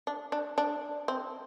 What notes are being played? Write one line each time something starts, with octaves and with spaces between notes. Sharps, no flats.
D4
D4
D4
C4